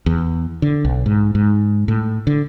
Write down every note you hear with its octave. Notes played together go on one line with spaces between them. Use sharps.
E2
D3
B1
G#2
G#2
A2
D3